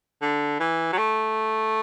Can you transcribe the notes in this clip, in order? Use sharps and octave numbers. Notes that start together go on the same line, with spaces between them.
D3
E3
F#3
A3